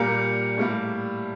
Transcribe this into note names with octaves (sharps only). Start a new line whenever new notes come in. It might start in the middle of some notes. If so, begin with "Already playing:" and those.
Already playing: A#2 G3 A#3 A#4
A2 G3 A#3